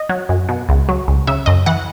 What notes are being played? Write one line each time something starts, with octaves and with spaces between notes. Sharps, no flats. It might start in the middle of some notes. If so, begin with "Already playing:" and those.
Already playing: D#5
F#3
F#2
B2
C#2
F#3
C#2
C#3 E5
F#2 D#5
E3 F#5